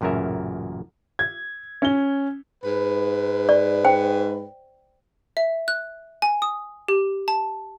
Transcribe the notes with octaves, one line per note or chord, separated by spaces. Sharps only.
A1 F#2 A#2 C#3 A#4 E5
G#6
C#4 G7
G#2 B4
D5
C5 G5
E5
F#6
G#5
D#6
G4
A5